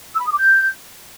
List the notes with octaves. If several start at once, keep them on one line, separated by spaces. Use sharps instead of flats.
E6
B5
D#6
D6
G6